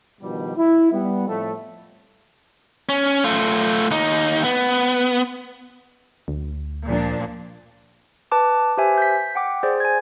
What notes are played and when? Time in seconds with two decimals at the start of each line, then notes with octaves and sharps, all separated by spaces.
0.21 G2 B2 D#3 F3 G3
0.56 E4
0.91 G3 B3
1.28 F2 A2 A3
2.89 C#4
3.24 A3 F4
3.91 D#2 D#4
4.44 B3
6.28 D2
6.88 A#2 F3 D4
8.32 B4 A5 D6
8.77 G4 B4 C5 E5 G#5
8.98 G6 B6
9.35 F#5 G5 D6
9.63 G#4 C5 D5
9.80 G#5 G#6